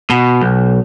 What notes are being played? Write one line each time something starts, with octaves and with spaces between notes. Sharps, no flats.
B2
B1